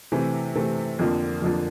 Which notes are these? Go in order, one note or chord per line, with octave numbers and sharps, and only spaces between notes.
C3 E3 A3 C4
C3 E3 A3 C4
F2 D3 F3 A#3
F2 D3 F3 A#3